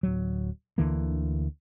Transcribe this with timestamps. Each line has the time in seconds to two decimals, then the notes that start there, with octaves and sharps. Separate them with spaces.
0.03 D1 F#3
0.78 D2 D3 E3 A#3